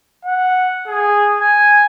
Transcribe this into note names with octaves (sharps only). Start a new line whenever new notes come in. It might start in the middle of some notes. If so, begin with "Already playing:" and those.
F#5
G#4
G#5